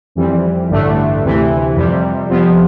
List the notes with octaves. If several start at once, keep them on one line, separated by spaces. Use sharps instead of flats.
F2 E3 G3 C4
A1 G2 D3 A3 D4
D2 C3 E3
F2 C3 G3
F2 C3 F3 B3